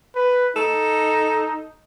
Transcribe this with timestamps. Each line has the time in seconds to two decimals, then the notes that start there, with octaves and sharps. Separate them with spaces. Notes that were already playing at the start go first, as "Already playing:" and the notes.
0.15 B4
0.56 D#4 A4